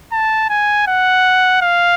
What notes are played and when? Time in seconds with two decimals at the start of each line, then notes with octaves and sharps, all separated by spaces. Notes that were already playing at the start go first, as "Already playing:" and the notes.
0.13 A5
0.50 G#5
0.88 F#5
1.62 F5